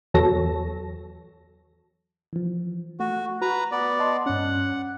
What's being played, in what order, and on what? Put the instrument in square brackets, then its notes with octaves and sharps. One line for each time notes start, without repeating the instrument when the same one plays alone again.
[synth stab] E2 F#3 A4 A#6
[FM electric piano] E3 F3
[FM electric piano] A3 [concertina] F#4
[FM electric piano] F#4 [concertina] B4 A#5
[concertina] B3 D5
[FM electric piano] D#5 A5 C6
[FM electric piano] G2 C#4 [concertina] F#5